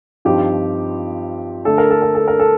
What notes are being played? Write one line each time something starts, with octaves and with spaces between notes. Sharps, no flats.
G2 F3 C4 D#4 G4
D3 A3 D4 A4
A#4
A4
A#4
A4
A#4
A4